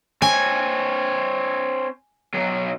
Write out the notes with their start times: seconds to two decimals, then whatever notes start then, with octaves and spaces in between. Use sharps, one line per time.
0.22 C4 C#5 G#5
2.34 B1 F#3